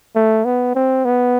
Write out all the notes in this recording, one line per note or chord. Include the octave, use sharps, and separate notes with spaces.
A3
B3
C4
B3